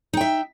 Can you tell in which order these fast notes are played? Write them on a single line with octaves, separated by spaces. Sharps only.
D#4 G5 E5